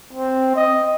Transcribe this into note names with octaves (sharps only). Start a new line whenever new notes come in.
C4
D#5